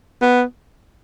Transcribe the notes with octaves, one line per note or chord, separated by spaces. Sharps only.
B3